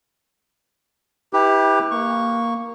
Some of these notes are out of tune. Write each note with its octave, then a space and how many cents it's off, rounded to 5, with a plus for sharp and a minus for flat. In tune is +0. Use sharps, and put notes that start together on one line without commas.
E4 -30 G4 +15 B4 +0
A#3 +0 C#6 +0